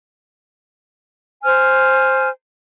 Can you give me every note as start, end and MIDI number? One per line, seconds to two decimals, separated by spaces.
1.43 2.28 72
1.43 2.28 80
1.43 2.28 89